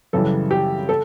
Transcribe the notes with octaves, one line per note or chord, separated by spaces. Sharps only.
F#2 C#3 E3 G3 A4
G4
A4